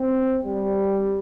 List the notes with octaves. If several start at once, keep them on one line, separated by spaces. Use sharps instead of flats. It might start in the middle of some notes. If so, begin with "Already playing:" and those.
Already playing: C4
G3